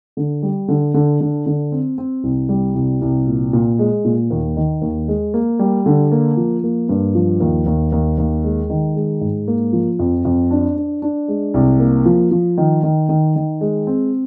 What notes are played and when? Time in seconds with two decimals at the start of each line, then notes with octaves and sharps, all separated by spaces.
0.17 D3
0.43 G3
0.68 D3
0.94 D3
1.20 D3
1.46 D3
1.72 C4
1.98 C4
2.23 C2
2.49 G3
2.75 C2
3.01 C2
3.27 A#2
3.53 A#2
3.79 G#3
4.05 A#2
4.30 D#2
4.57 D#3
4.82 D#2
5.08 G#3
5.34 A#3
5.59 G3
5.86 D3
6.12 A#3
6.37 F3
6.64 A#3
6.89 G2
7.15 F3
7.40 D#2
7.66 D#2
7.92 D#2
8.18 D#2
8.44 G#3
8.70 D#3
8.96 G#3
9.21 G#2
9.48 A#3
9.73 F3
9.99 F2
10.25 F2
10.51 D4
10.76 D4
11.02 D4
11.28 G#3
11.54 C2
11.80 A#3
12.06 F3
12.31 F3
12.57 D#3
12.83 D#3
13.09 D#3
13.36 D#3
13.61 G#3
13.87 C4